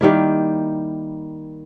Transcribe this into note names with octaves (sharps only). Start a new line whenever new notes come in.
D#3 G3 A#3 E4